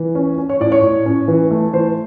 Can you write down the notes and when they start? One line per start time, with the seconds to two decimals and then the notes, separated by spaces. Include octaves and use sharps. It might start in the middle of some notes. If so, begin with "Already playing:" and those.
Already playing: E3
0.15 C#4
0.38 C#4
0.49 C#5
0.60 A2 D5
0.72 C#5
0.83 A2
1.06 C#4
1.28 E3
1.51 A3
1.73 E3 C5